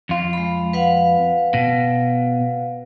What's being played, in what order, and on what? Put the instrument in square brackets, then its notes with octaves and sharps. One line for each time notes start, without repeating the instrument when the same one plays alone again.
[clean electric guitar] F2 F4
[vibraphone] G#3 B5
B4 F5 F#5
[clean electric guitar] B2